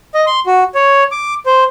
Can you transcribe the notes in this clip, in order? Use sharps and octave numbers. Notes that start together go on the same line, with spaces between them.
D#5
C6
F#4
C#5
D6
C5